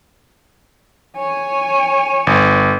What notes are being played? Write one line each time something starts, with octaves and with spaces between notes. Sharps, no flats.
C#5 G#5
G1